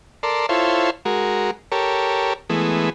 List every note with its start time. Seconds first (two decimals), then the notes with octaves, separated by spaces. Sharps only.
0.23 A4 A#4 D5 C6
0.49 E4 F4 A4 C5 C#5
1.05 G#3 F#4 A#4
1.72 G4 A4 A#4 C#5
2.49 E3 G#3 A3 B3